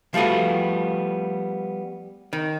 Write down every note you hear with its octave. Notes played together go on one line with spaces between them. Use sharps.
F3 G3 A3 B3 F#4
D#3